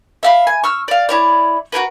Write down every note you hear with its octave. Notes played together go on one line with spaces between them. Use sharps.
E5 F5 B5
G#5
C#6 E6 F6
D5 F5
E4 C#5 D5
F#4 G#4 A#4 B4